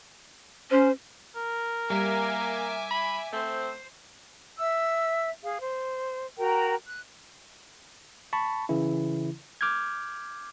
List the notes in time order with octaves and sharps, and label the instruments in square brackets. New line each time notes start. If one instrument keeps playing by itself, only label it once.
[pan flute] C#4 [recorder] C5
[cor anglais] A#4
[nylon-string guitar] G3 [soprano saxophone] A#3 [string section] E5 G#5 D6
[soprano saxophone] B5
[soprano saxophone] A3 [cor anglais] C4 [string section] C5
[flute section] E5 E6
G#4 F5
C5
F#4 A#4 G5 A#5
F#6
[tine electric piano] A5 B5 C#6
C#3 E3 E4
D6 F6 G6 G#6